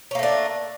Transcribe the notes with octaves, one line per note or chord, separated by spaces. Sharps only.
A3 A#3 C#4 D4